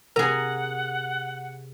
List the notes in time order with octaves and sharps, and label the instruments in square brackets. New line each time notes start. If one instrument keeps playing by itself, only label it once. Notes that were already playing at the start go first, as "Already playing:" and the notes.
[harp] C3 D#7 [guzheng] G#4 A#5 [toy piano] A#4 [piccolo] F#5